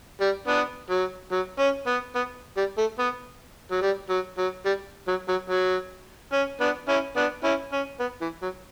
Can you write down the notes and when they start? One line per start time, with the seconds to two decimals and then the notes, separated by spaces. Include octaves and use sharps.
0.21 G3
0.48 B3 D4
0.90 F#3
1.31 F#3
1.59 C#4
1.87 B3
2.15 B3
2.57 G3
2.78 A3
2.99 B3
3.72 F#3
3.82 G3
4.10 F#3
4.38 F#3
4.66 G3
5.08 F#3
5.29 F#3
5.50 F#3
6.33 C#4
6.61 B3 D4
6.89 C#4 E4
7.17 B3 D4
7.44 C#4 E4
7.72 C#4
8.00 B3
8.21 E3
8.42 F#3